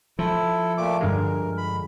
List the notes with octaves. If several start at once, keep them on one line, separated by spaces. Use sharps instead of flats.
F3 E4 A4
A#2 A3 D6
G2 D3 G#3 A#4
B5